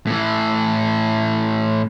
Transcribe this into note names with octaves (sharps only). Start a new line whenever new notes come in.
A2 E3